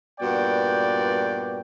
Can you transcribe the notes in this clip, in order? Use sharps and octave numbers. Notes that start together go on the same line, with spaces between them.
G2 A#2 B3 F#4 D5 G5